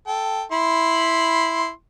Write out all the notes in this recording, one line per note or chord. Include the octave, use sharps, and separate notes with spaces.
A4 G5
E4 B5 C6